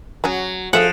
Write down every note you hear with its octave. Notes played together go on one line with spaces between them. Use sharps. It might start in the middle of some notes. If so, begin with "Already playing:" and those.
F#3 C#4 F#4 G#4
F3 G#4 A4 E5 F#5